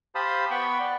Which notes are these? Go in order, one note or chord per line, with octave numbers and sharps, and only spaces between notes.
G4 C5 F5 A5 B5 D#6
B3 G5 B5 C#6
D5